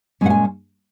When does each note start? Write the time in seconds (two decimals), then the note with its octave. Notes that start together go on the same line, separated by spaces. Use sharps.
0.21 A#2 G#3 C#4 F#5
0.30 G#5